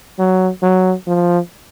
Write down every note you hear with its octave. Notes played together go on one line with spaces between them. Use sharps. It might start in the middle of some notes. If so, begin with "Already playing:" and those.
F#3
F#3
F3